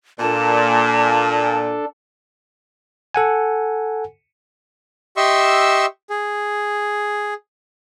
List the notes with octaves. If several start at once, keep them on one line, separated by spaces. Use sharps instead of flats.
A#2 D4 A4 A5
A4 F#5 G#5
G4 D#5 E5 C6 C#6 E6
G#4